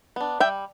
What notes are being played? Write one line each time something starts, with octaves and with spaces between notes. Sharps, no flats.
B3 D4
G3 E5 G5